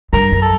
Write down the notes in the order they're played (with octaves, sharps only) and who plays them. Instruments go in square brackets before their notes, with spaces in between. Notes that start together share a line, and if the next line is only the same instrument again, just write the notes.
[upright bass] G2 [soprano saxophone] A#4
[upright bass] F#2
[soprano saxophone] A4